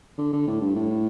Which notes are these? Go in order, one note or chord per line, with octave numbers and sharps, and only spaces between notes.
D3
D3
A2
G2
A2